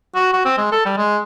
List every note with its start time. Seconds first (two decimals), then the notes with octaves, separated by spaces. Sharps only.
0.15 F#4
0.33 F#4
0.45 C4
0.58 G#3
0.72 A4
0.85 G3
0.97 G#3